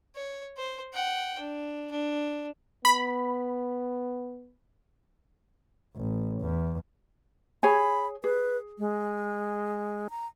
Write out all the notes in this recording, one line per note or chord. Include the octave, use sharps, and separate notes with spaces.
C#5
C5
F#5 G5
D4
D4
B3 B5
A1
E2
G#4 C#5 G#5 B5
G#4 B4
G#3
A#5